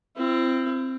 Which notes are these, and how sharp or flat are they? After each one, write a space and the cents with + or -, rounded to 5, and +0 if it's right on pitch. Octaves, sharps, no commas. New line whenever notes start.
C4 +0 E4 +40